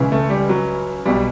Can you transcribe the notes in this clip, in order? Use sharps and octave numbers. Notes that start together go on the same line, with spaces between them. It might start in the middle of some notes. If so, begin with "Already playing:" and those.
Already playing: C#2 C#3 E3
A3
G3
F#3
B1 B2 G3